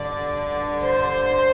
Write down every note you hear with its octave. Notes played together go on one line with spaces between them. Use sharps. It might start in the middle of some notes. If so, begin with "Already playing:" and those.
Already playing: G2 D3 D5
C5